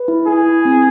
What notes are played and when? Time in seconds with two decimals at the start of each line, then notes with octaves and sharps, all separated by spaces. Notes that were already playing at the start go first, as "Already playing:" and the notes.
Already playing: B4
0.08 E4
0.27 E4 G#4
0.46 E4
0.65 C4